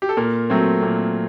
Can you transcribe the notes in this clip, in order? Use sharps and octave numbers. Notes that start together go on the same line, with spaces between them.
G4
A4
A#2 A#4
F#3 A3 C4
A#2